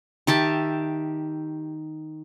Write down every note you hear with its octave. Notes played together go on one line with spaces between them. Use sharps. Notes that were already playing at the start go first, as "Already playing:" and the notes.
D#3 G4 E5 A5